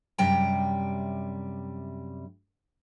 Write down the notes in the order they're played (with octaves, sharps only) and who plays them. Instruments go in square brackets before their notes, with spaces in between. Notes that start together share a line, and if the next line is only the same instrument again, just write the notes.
[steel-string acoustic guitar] F#2 C3 G3 G5 A#5